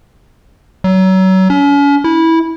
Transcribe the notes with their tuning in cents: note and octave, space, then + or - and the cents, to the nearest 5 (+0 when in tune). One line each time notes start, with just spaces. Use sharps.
F#3 +30
C#4 +40
E4 -15